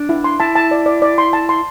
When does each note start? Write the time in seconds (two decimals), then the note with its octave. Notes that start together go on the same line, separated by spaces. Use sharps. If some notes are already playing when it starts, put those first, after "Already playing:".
Already playing: D4
0.09 E4
0.24 C6
0.40 E4 A5
0.56 A5
0.71 D5
0.86 D5
1.02 D5
1.18 C6
1.33 A5
1.49 C6